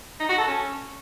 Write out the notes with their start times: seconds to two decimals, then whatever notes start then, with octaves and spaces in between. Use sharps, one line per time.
0.20 D#4
0.29 F#4
0.38 A4
0.47 C#4